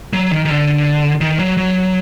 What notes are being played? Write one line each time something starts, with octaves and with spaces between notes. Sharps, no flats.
F#3
D#3
D#3
D3
D#3
F#3
F#3